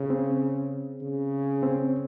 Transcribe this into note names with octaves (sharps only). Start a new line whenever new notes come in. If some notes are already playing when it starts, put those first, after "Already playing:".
Already playing: C#3
C4
C#3
C4